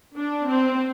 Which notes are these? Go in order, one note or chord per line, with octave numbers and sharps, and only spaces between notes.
D4
C4